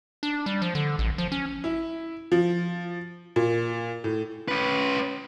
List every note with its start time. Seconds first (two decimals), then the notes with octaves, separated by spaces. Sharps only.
0.23 D4
0.46 G3
0.62 F3
0.75 D3
0.99 A1
1.18 F3
1.32 C#4
1.64 E4
2.32 F3
3.36 A#2
4.04 A2
4.48 C#4 B4